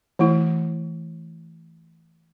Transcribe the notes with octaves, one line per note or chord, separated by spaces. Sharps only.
E3 A3 E4